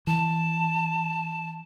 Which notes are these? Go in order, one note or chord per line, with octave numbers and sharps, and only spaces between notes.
E3 A5